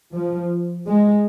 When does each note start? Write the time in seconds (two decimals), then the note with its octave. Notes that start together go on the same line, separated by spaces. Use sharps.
0.14 F3
0.88 G#3